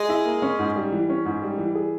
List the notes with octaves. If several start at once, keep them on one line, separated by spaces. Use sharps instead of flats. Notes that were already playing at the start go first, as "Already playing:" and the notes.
Already playing: G#3 G#4
E4
A#3
C#4
G#2
G3
E3
C#4
G#2
G3
E3
G#4